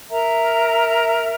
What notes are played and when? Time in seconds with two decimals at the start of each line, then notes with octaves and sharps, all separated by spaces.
0.10 A#4 E5 A#5